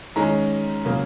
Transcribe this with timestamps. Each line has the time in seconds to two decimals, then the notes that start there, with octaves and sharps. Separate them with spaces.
0.16 D#3 G#3 C#4 A#5
0.85 C#3 F#3 A#3